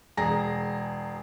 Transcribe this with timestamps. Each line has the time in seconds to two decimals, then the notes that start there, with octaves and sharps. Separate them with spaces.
0.17 E1 G#4 A#5 A#6